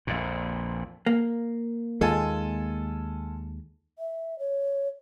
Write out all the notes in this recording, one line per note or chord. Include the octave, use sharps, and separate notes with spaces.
A#1 F2 A#2
A#3
D#2 G#3 F4 A4 G#5
E5
C#5